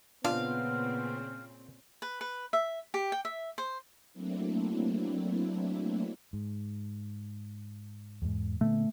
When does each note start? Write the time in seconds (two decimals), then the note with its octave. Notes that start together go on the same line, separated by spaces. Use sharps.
0.25 A#2 C#3 B3 C4 D4 F4 F5
2.02 B4
2.21 B4
2.53 E5
2.94 G4
3.12 G5
3.25 E5
3.58 C5
4.13 F#3 A3 A#3 C4 D4 E4
6.33 G#2
8.22 E2 G#2
8.61 A#2 D3 A3 B3